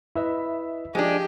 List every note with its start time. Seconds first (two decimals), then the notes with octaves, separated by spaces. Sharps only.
0.16 E4 B4 D#5 E5
0.95 F3 G#3 D4 G4